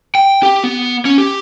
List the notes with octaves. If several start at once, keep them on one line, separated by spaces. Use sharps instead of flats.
G5
G4
B3
C#4
G4